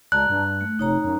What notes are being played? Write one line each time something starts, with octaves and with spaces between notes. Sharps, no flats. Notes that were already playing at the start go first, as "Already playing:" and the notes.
C#2 D5 A5 A#5 F#6
G2
A3
F1 D#4 C#5 A#5
F#2